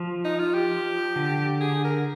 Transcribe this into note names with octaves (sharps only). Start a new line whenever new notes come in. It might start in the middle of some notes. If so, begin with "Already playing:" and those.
Already playing: F3
D#4
F4
G4
D3
G#4
A#4